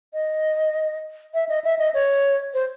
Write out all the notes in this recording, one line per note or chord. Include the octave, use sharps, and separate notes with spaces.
D#5
E5
D#5
E5
D#5
C#5
C5